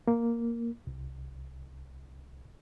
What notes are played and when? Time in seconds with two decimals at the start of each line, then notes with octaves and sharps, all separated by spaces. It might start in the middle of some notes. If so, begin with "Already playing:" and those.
0.08 A#3
0.87 C2